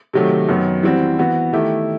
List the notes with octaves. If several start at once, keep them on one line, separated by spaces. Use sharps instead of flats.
C3 D#3 F#3 A3
F#2 D#3 F#3 B3
E3 G3 C4 F#4
E3 B3 F#4
D#3 A3 E4 G4